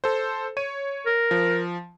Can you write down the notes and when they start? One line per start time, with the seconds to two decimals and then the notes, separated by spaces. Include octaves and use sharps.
0.04 A4 C5
0.57 C#5 D#7
1.06 A#4
1.31 F3